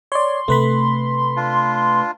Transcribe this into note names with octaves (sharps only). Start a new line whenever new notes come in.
C#5 D5 C6
C3 A3 B4 B5
D4 F4